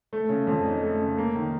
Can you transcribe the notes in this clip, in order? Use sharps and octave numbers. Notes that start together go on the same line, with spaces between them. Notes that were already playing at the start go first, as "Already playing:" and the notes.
A3
C#3
F2
D#4
A3
C#3
A#3
D#3